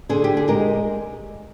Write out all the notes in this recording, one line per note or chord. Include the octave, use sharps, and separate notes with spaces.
D3 G#4 C5
G4
G#4
G#3 G4 A#4